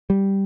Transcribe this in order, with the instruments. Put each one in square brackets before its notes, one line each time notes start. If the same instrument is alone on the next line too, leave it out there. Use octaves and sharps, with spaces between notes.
[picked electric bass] G3